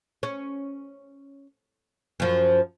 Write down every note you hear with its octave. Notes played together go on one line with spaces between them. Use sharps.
C#4
F#2 F3